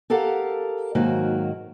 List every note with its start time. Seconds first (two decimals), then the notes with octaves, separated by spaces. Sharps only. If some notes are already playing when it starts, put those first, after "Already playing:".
0.10 G4 A4 A#4 F5 F#5
0.95 G#2 D#3 F#3 A#3 F#4